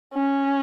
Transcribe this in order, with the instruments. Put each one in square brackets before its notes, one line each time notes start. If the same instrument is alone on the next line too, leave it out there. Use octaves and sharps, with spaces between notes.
[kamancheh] C#4